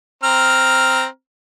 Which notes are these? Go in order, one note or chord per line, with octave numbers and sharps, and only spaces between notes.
C4 A#5 F6